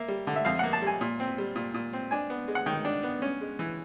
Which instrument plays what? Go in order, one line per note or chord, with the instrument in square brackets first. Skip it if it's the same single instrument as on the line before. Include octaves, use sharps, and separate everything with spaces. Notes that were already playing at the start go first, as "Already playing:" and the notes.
Already playing: [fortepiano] A#3 E5
G3
D3
E5
F2 F5
A#3 F#5
A5
G3 G#5
A#2
C4
G3
A#2
A#2
C4
D4 G#5
B3
G#3
F#5
D#3 G5
D4
B3
C#4
G#3
E3